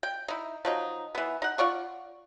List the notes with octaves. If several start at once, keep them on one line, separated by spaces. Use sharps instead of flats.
G5
D#4 E4
F3 F#3 D#4
E3 B3
D#4 F#5
F4 D5 F#5 C#6